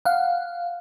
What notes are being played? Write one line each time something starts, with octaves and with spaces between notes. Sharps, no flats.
F5 F#5